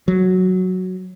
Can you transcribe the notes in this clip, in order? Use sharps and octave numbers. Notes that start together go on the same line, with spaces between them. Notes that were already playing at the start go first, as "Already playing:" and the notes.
F#3